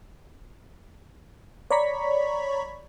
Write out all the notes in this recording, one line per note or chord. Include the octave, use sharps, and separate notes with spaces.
C#5 D5 A#5 B5 C#6 B6